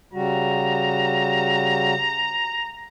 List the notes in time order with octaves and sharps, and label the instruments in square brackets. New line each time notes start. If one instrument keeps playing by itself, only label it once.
[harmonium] C#3 G3 F#4 [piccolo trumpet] A#5